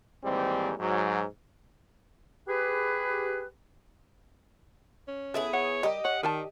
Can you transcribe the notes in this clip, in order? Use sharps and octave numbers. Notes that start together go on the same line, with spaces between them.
D#2 G#2 E3 G3 C4
G#2 F#3
G4 G#4 B4
C#4
B3 E4 G#4 A4
C#5 F#5
G3 G4 A#4 D#5
C#5 F#5
D#3 A#4 D5 A5